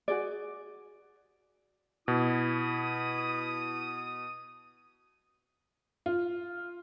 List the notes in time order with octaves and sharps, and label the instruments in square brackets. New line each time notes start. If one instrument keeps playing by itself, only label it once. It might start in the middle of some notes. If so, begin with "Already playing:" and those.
[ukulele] F#4 G#4 D5
[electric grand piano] B2 [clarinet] E4 [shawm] D#6
[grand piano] F4